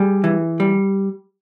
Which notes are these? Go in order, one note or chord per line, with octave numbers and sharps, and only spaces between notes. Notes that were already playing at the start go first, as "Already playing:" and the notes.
Already playing: G3 G#4
E3
G3